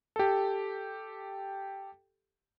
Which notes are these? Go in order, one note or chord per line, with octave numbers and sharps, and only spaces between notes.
G4 A4